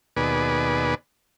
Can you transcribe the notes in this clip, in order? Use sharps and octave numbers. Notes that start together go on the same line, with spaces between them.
D#2 B2 G#4 B4 D5